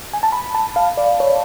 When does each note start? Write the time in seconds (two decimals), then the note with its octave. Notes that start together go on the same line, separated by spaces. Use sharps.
0.13 G#5
0.23 A5
0.32 B5
0.55 A5
0.76 F5
0.97 D5
1.20 C#5